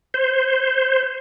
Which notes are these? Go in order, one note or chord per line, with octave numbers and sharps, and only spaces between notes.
C5